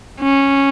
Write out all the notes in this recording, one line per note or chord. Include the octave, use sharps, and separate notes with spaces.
C#4